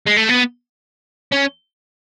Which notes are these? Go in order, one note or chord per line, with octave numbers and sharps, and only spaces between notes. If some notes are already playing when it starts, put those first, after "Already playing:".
G#3
A3
B3
C#4